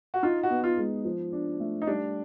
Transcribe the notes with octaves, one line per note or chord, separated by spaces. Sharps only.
F#4
D#4 F4
F#4
B3
F4
G#3
F3
D4
A3
D#4
G3 D4